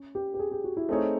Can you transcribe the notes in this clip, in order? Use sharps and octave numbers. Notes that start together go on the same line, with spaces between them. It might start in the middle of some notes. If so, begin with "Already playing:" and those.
Already playing: C#4
G4
G4
G#4
G4
F#4
E4
A3 C4 D#4 G#4 C#5